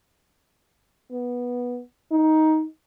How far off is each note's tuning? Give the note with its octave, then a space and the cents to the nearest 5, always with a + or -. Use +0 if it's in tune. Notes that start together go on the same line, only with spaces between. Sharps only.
B3 -10
D#4 +10